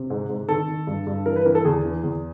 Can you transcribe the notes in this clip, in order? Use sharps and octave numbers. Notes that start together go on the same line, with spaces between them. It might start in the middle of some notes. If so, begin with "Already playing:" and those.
Already playing: C3
G#2
G#2
D#3 A4
D#3
G2
G2
E3 A#4
B4
E3 A#4
A4
E2 G#4
E3
E2